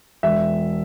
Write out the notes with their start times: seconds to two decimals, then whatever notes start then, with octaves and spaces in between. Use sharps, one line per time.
0.23 E1 E5